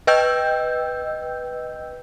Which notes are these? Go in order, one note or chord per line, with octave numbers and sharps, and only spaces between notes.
B4 D#5 G5 E6 G6